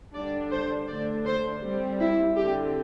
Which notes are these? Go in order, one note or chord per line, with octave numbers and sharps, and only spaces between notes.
D3 G3 D4 D5
C5
D3 A3 D4 D5
C5
G3 C4
E4
D3 C4 G4